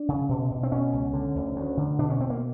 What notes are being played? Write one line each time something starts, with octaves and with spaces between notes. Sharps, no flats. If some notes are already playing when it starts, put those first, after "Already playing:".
Already playing: D4
C#3
B2
B2
C4
B2 C#4
C#2
D3
D2
D2
D3
B2 D4
C#4
B2 C4
A#3